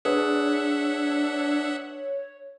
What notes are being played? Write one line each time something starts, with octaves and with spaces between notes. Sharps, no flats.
D4 G#4 B4 C#5 E5 F#5